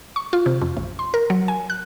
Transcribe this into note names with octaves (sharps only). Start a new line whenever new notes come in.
C#6
F4
C3
F2
A1
C6
A#4
F#3
G#5
F#6